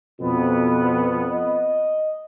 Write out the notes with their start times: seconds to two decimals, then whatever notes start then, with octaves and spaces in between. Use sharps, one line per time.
0.21 F2 B2 B3
1.32 D#5